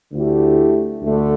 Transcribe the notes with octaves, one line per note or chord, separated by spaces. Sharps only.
D2 D3 A3 E4 G4
D2 D3 A3